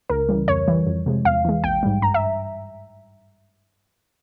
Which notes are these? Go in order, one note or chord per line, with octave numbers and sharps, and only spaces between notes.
C#2 A#4
C#3 E3 G3
F2 C#5
E3 G3
F2
C3 F3 G#3
E2 F5
E3 G#3
A#1 G5
G#2 G3
G2 A#5
E5